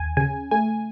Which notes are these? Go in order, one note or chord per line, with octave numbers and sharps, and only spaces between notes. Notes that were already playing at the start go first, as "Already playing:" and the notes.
Already playing: D#2 G#5
C#3 G#5
A3 G#5